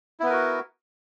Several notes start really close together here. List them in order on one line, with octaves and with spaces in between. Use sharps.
E4 B3 B4 A#4 F#4